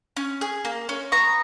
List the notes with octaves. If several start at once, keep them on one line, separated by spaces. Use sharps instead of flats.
C#4
G#4
A#3
C#4
B3 A#5 C#6